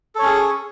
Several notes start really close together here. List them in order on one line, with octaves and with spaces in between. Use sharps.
A4 C#5 C#4 G#4